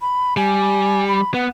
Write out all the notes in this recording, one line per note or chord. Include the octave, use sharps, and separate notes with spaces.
B5
G3 G#5
B5
B3 F#5